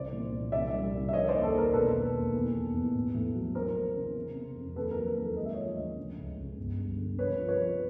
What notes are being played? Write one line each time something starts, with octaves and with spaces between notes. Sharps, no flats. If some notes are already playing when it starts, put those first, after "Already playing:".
Already playing: C2 C#3 C5 D5
A#2
A#2
C2 D5 E5
G3
C2
E5
D#3 C#5 D#5
D#2 C5 D5
A4
D#2 A#4
E1 A4 B4
D#3
D#2
E2
E2
E2
A1
A2
F#3
E3 A#4 C5
E3
C#3
C3
C3
F2
D#2 A4 B4
F#3 A#4
A#4
D#2
A4
G#3 D#5
E5
F3 C#5 D#5
D2
C#3
C#2
C#2
G1
G3
D3
C3 B4 C#5
F3
B4 C#5
F3